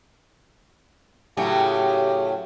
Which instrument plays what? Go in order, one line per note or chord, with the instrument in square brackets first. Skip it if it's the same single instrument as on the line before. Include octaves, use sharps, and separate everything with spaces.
[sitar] A2 C#3 F#3 [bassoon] G4